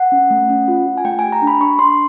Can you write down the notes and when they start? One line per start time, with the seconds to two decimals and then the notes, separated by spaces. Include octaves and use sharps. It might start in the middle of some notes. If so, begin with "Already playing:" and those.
Already playing: F#5
0.12 C#4
0.30 A3
0.49 C#4
0.68 F4
0.86 F4
0.97 G#5
1.05 A3 G5
1.19 G#5
1.24 G4
1.32 A#5
1.42 D4
1.47 B5
1.61 D4 C#6
1.79 D4 C6